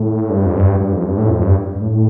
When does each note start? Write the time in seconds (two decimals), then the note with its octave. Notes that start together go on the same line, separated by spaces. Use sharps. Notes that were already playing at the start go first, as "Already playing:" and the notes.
Already playing: A2
0.30 G2
0.46 F2
0.56 G2
0.80 G2
0.93 F2
1.05 G2
1.18 A2
1.30 F2
1.43 G2
1.75 G2
1.81 A2